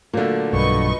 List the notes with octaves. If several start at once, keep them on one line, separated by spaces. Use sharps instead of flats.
A#2 D3 F#3 A3 A#3
B1 G2 B4 D#5 C#6